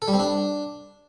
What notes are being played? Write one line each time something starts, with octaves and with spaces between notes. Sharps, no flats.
A4
G3
C4
D4